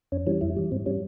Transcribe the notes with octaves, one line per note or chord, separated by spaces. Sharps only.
F2 C#4
E3 G3 C#4
F2 E4
E3 G3
G#2 C4
G3 C#4